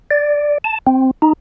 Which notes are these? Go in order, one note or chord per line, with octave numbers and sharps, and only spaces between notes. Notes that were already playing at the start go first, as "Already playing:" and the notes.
D5
A5
C4
D#4